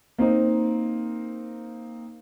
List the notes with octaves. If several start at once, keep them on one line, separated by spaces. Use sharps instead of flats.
A#3 C4 D#4